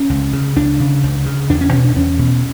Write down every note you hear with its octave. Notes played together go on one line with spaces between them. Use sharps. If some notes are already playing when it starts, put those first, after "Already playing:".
Already playing: C#4
C#2
C#3
C#2 D4
C#3
C#2
C#3
E2 D4
C#4
B2 C#4
D4
E2 C#4
B2